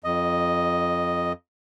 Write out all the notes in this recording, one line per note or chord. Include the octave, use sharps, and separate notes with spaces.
F2 D#5